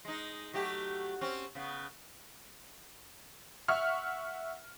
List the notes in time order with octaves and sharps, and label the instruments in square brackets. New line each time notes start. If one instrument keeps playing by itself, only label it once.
[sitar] G#3 D#4
F#3 A3 G4
C4 C#4
C#3 B3
[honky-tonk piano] E5 F#5 C#6 F6